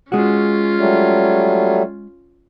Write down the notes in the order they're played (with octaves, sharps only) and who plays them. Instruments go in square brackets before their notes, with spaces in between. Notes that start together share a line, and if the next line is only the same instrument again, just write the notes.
[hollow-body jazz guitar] G#3 F#4 [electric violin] C#4 F4
[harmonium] F#3 G3 A3